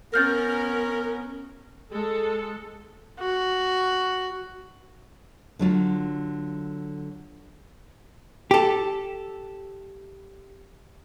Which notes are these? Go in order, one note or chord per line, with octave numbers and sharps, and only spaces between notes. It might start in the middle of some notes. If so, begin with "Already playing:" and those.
B3 C#4 A#4 F6 G6 A6
G#3 A4
F#4
D3 F#3 F4 F#4
G4 A4